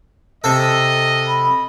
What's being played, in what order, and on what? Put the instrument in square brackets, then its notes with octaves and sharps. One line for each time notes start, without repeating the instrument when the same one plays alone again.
[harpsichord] C3 A4 [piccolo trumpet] D#5
[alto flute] B5